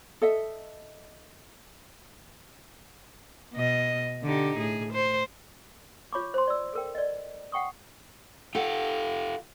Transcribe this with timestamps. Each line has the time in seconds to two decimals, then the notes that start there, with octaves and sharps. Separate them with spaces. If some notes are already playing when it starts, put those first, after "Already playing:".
0.22 A4 D#5 E5
3.53 B2 D#5
4.23 D3 D#4 G4
4.57 A2 G#4
4.92 C5
6.13 F4 C#5 B5 C#6 D6
6.34 C5 C6
6.48 D5 E6
6.73 A4 A#4 G5
6.95 D5 D#5
7.52 F#5 G5 C#6 D#6
8.55 F4 G4 A4 F#5